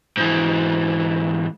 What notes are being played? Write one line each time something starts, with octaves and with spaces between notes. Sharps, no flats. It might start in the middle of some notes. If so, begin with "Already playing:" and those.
G#2 E3